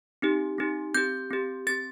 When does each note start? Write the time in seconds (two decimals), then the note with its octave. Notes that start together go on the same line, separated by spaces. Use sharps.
0.22 C4 D#4 G4
0.58 C4 D#4 G4
0.95 C4 G4 G6
1.30 C4 G4
1.67 C4 G4 A6